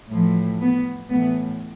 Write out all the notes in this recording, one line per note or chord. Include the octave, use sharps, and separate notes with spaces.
A2 E3 F3
B3
A2 E3 B3